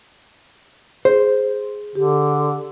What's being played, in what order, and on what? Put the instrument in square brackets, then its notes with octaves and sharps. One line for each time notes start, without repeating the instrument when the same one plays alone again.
[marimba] G#4 [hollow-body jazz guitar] C5
[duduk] D3 [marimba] G4